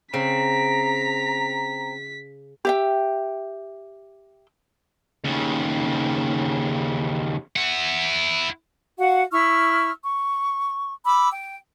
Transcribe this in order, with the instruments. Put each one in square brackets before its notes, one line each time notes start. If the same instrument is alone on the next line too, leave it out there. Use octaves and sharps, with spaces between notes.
[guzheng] C#3 [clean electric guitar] C4 [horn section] A#5 [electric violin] B6
[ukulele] G4 E5 G5
[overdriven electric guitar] D#2 C#3
[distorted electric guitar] E4 F#5
[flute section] F#4 F5 F#5
E4 C#6 E6 F6
C#6
B5 D6 E6
G5